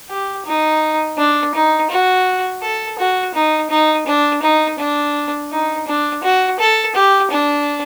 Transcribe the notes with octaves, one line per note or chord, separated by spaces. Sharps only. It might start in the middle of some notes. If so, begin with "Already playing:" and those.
G4
D#4
D4
D#4
F#4
A4
F#4
D#4
D#4
D4
D#4
D4
D#4
D4
F#4
A4
G4
D4